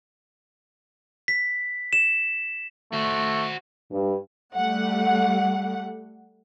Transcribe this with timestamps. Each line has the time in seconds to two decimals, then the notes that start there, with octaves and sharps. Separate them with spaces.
1.28 B6
1.93 E7
2.92 A3 F#4 C5
3.91 G2
4.55 G3 A3 F#5